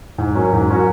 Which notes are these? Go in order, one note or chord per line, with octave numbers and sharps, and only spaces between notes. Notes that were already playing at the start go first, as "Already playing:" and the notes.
G#2
F#3 C#4 F#4 A#4
G#2
F#3 C#4 F#4 A#4